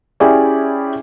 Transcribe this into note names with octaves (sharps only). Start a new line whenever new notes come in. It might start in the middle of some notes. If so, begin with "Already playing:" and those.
C#4 E4 G4 G#4 D5